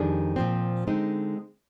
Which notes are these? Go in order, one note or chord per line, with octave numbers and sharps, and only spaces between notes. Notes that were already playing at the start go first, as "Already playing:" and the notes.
Already playing: F2 D#3 G3 D4 G#4
A#2 F3 C4
D3 G#3 C4 D#4